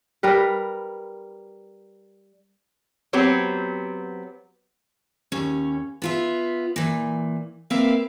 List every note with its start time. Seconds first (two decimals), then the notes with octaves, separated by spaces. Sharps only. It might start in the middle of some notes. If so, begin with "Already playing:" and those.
0.23 G3 A#4 B4
3.13 F#3 B3 C4 G4
5.32 D#2 C#4
6.02 B3 F4 E5
6.76 A#2 E3
7.70 A#3 C4 A#4 B4 E5 F5